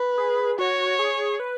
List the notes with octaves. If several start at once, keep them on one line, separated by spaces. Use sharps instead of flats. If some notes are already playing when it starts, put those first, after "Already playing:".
Already playing: B4
G#4
F#4 C#5
G#4
B4